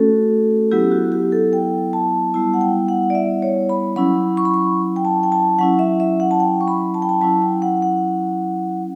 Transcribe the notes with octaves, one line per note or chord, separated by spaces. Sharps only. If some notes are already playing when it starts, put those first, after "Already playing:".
Already playing: A3 C#4 F#4 A4
F#3 B3 E4 G4
F#4
G4
A4
G5
A5
G3 B3 E4 A5
F#5
G5
F#5
D5
E5
C#5
B5
F#3 C#4 E4 B5
C#6
B5
C#6
G5
A5
G5
A5
F#3 C#4 E4 F#5
E5
E5
F#5
A5
G5
C#6
B5
A5
G5
A5
F#3 C#4 E4 A5
G5
F#5
F#5